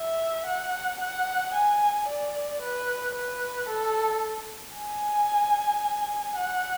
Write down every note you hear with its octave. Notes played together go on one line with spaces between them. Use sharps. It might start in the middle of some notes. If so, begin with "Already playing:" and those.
Already playing: E5
F#5
F#5
G#5
D5
B4
B4
A4
G#5
F#5